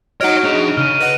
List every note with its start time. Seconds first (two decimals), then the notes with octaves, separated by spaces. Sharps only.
0.21 D#4 F#4 C#5 D#5 F#5 F6 D7
0.44 D4 G#4 F7
0.77 C#3 F6 D#7
1.00 B4 D#5 F#5